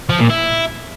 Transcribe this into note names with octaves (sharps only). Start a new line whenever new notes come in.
F3
A#2
E4